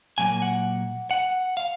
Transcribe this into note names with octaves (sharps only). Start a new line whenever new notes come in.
A#2 F#3 A#3 G#5
F#5
F#5
F5